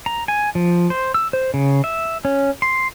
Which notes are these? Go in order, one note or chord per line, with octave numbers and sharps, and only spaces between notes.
A#5
G#5
F3
C5
E6
C5
C#3
E5
C#4
C6